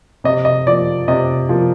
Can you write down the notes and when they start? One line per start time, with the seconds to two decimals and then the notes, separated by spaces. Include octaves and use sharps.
0.24 C3 D#5
0.45 D#5
0.67 F3 D5
0.70 A#3
1.08 C3 D#5
1.49 F3 A#3